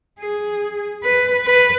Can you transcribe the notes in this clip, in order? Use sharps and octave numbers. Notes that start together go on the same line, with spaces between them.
G#4
B4
B4